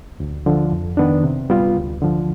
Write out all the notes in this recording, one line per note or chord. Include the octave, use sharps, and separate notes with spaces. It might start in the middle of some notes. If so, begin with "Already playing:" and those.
D2
D3 F3
F2
D#3 B3 D4
C3
G3 B3 F4
D2
D3 F3